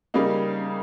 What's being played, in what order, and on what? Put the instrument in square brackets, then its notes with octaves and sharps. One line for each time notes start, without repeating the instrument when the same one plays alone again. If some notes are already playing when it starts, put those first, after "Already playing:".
[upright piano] C#3 G3 A#3 D#4